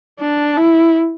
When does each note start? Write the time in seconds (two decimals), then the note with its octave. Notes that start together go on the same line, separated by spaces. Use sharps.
0.20 D4
0.57 E4